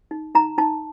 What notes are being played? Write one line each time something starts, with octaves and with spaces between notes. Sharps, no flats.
D#4
D#4 A#5
D#4 A5